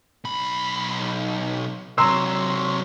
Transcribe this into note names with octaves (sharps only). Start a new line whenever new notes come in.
B1 B5
C3 F#3 A#5 C6 E6